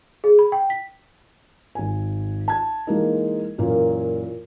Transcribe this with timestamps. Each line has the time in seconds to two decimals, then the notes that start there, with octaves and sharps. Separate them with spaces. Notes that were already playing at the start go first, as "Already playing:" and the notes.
0.24 G#4
0.39 B5
0.52 G5
0.70 B6
1.75 G#1 G#5
2.48 A5 G#6
2.87 E3 G#3 A#3 D#4
3.58 F#2 A#2 E3 A#3